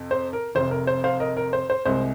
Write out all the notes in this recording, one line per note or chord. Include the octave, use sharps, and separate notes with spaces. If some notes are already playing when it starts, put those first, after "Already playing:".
Already playing: F2 C3
C5
A#4
F1 F2 C3 C5
A#4
C5
C5 F5
A#4 D#5
A#4
C5
C5
C2 C3 G#3 C5